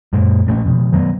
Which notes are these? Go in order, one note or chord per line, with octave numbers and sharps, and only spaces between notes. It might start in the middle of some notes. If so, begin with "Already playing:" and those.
F#2 A#2 G#3 A#3
A#2 A3 B3 C#4
F2 B2
D#3 F#3 B3